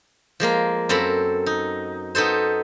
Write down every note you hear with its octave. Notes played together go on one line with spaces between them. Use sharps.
F3 G#3 A#3 A#4
F#2 C4 A4 A#5 B5
D#4
B3 D#4 A4 C5